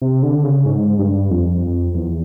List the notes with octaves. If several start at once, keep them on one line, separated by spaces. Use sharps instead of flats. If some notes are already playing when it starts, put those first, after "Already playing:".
C3
D3
C#3
G#2
G2
F2
E2